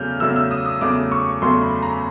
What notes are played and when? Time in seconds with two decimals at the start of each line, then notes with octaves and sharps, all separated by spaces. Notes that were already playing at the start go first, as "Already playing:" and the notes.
Already playing: E2 C#3 F#3 A3 F6 G6
0.20 E2 C#3 F#3 A3 E6
0.36 E6
0.51 D#6
0.66 D#6
0.81 E2 C#3 F#3 A3 D6
1.12 C#6
1.42 E2 C#3 F#3 A3 C6
1.62 B5
1.82 A#5